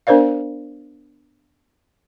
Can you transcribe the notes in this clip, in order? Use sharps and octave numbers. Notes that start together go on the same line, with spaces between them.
B3 D4 A#4 C5 D5 F5